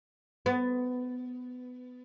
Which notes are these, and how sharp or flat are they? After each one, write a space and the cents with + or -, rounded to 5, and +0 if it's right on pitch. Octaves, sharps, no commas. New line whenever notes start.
B3 +20